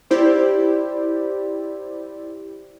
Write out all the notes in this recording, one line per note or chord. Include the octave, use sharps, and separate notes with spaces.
E4 G4 C5 D5